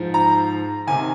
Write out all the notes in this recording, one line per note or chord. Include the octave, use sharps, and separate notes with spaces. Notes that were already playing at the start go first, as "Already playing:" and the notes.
Already playing: G#2 F3
A#5
C3 D#3 G#5